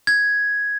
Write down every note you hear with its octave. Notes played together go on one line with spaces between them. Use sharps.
G#6